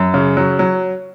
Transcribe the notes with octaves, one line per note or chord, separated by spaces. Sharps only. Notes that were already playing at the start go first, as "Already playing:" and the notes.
Already playing: F#2
C#3
F#3
F#3